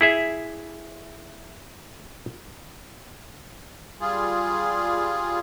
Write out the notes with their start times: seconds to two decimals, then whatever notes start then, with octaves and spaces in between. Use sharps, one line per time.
0.01 E4 G#4 E5
4.01 G3 F4 G#4